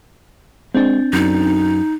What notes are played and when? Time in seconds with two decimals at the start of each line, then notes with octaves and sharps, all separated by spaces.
0.75 G#3 C4 D4
1.13 F#2 D#4